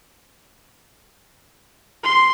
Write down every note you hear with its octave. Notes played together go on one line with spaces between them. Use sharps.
C6